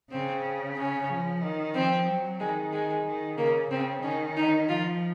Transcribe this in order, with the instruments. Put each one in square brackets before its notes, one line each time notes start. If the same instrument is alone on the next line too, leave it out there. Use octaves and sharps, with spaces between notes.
[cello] C#3 [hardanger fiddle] C4
[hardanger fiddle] C#4
[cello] F3
D#3
[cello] F3 [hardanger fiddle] C4
[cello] F#3
[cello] D#3 [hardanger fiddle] G#3
[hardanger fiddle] G#3
[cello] D#3
[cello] C#3 [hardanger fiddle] A#3
[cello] C#3 [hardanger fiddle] C4
[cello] D#3 [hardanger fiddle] C#4
[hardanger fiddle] D#4
[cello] F3 [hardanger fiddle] F4